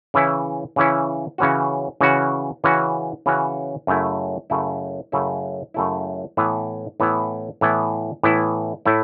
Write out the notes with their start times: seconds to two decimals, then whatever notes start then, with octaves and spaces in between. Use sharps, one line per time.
0.14 C#3 E3 C#4 E4
0.76 C#3 E3 C#4 E4
1.38 C#3 E3 C#4 F#4
2.01 C#3 E3 C#4 F#4
2.64 C#3 E3 C#4 F#4
3.26 C#3 E3 C#4 F#4
3.87 F#2 C#3 A3 E4
4.50 F#2 C#3 A3 E4
5.12 F#2 C#3 A3 E4
5.74 F#2 C#3 A3 E4
6.37 A2 E3 B3 E4
7.00 A2 E3 B3 E4
7.61 A2 E3 B3 E4
8.23 A2 E3 B3 E4
8.86 A2 A3 E4